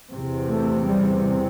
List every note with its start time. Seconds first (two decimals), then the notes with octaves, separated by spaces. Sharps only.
0.12 E2 C3
0.48 A3
0.86 G3